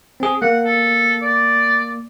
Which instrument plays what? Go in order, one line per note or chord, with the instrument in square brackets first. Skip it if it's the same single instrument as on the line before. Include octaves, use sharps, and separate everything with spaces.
[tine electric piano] C4 G#4
[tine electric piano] A#3 [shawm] F#5
[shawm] A4
D5